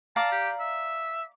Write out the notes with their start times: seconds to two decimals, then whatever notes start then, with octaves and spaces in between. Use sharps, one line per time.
0.16 D5 F5 A5 A#5
0.32 G4
0.60 E5